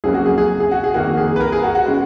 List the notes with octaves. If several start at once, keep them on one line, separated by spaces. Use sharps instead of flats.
F2 C#3 F#3 A#3 G#4
F#4
G#4
G#4
G#4
F#4
G#4
F2 D#3 A#3 F#4
G#4
B4
A#4
G#4
F#4
F#4
C#3 G#3